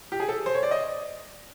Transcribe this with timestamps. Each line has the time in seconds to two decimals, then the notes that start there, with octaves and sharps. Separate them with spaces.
0.12 G4
0.20 G#4
0.29 A4
0.46 C5
0.54 C#5
0.63 D5
0.71 D#5